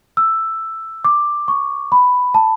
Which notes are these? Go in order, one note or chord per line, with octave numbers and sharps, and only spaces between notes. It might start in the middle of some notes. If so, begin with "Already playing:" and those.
E6
D6
C#6
B5
A5